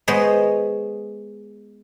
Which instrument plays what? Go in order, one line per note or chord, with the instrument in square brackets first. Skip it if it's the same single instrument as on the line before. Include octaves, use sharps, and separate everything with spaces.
[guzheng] G#3 B3 C5 C#5 D#5